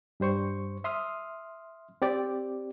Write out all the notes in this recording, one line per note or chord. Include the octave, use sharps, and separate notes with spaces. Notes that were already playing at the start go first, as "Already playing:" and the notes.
G2 G3 C5 C#6
E5 C6 D#6 F6
C4 G4 D5